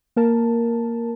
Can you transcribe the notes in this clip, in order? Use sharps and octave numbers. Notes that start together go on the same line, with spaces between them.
A#3 A#4 A5